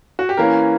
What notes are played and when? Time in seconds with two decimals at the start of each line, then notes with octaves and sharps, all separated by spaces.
0.19 F#4
0.29 G4
0.37 E3 A#3 C#4 A#4